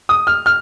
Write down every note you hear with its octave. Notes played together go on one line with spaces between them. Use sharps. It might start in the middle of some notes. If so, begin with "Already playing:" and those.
D#6
F6
F6